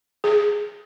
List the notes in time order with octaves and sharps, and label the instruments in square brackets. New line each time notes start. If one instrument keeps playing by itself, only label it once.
[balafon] G#4